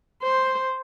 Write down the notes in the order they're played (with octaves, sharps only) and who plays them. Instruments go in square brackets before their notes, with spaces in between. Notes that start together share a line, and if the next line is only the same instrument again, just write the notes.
[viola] C5